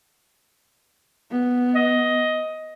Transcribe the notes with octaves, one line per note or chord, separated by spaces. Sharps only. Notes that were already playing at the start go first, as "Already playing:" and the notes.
B3
D#5